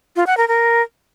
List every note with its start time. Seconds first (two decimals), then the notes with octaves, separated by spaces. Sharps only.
0.16 F4
0.27 F#5
0.37 A#4
0.48 A#4